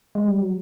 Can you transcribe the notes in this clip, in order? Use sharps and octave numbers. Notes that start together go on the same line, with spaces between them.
G#3
G3
F#3